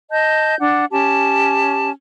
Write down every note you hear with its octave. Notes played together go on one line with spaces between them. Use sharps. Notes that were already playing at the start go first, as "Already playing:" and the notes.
D#5 A5 G6
D4 F#5
C#4 G4 A5